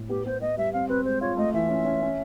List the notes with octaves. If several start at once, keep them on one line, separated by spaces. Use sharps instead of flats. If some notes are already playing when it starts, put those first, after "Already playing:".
Already playing: A2
B3 G4
B3 C5
B3 D#5
G3 E5
C4 F5
C4 B4
G#3 C5
F4 C#5
A3 D#5
E3 E5
C#4
C#4
C#4